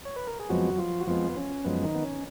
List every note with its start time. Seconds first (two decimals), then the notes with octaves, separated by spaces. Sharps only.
0.05 C#5
0.16 B4
0.27 A#4
0.39 G#4
0.49 F2 F3 F#3 G#3 B3 F#4
0.78 F3 F4
1.00 F#4
1.07 F2 F3 G#3 B3 F4
1.29 B3
1.36 C#4
1.65 F#2 F3 G#3 B3
1.84 D#3 D#4
1.95 B3
2.04 C#4